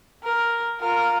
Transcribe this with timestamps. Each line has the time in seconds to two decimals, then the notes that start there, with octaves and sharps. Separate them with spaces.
0.23 A#4
0.80 F4 A#4